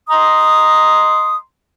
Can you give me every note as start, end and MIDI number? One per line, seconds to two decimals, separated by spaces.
0.10 1.38 75
0.10 1.38 82
0.10 1.38 84
0.10 1.38 87